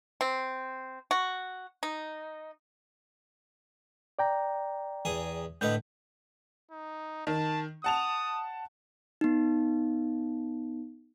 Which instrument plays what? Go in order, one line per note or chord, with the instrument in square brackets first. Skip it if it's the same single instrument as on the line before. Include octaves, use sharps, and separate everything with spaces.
[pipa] C4
F#4
D#4
[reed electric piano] D5 G5 A#5
[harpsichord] E2 G#4 D#6
[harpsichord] A2 D3 B4 [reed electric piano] D#5 G6
[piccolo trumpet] D#4
[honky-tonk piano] D#3 [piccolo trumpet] A5
[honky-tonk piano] F#5 A5 F7 [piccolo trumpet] D#6
[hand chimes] B3 D#4